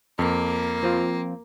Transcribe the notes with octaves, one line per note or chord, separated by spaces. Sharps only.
F2 A#3
F3 C4 F4